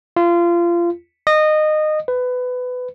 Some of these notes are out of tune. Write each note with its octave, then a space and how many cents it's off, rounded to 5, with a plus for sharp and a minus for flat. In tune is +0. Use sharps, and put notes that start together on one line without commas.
F4 -25
D#5 -20
B4 +20